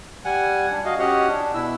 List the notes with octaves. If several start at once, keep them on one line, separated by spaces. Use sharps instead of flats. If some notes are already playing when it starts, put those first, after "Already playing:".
G3 F#5 G#5
D4
F#4 D#5 F5
C#4 F#4 G4 C#5 D#5 F#5
D4
B2 E4 E6